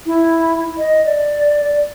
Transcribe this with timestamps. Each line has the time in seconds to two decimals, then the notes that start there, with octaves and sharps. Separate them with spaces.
0.06 E4
0.78 D#5
1.05 D5
1.61 D5